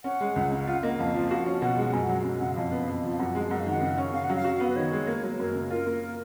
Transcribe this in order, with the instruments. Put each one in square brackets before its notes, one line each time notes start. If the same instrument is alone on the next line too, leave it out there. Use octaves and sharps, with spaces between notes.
[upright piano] C#4 [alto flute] F#5
[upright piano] G#3
C#2
C#3
[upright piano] F4 [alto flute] F#5
[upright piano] A#3 [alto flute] D#5
[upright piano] F2 [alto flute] F5
[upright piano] F3
F#4
C#4
[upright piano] B2 [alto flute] F#5
[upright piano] G#3
[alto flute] F#5
[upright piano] F#2 [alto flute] G#5
[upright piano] F#3 [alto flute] F#5
[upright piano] F#2
[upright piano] C#3 [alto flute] F#5
[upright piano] F2 [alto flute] F5
[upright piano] B3
F2
F3
[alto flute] F5
[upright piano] F#2 [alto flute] F#5
[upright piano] G#3
[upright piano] F#2 [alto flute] F#5
[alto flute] F5
[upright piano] D#3 [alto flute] F#5
[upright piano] C#3
C#4
[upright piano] C#3 [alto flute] F5
[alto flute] F#5
[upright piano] F#3
[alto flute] F5
[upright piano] F#4
B3
[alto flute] B4
[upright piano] D#3 [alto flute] C#5
[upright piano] G#3
A#3
F#3
[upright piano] F#2 [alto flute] A#4
[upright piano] C#3
[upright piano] F4 [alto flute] A#4
[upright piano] A#3